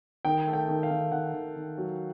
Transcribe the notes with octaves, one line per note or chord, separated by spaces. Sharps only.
D#3 G5
A3
G5
D#3
F5
D#3
D#3 F#5
D#3
D#3
F#3